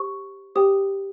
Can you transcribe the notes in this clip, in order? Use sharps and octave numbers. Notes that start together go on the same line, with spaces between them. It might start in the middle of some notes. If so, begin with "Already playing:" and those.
Already playing: G4 C5 C#6
G4 C5 G5 D#6